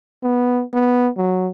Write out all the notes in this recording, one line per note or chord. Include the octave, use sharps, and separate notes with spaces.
B3
B3
F#3